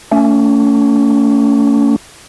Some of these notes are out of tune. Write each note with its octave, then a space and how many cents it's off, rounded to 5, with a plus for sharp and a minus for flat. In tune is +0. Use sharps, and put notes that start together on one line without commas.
A3 +25 C#4 +30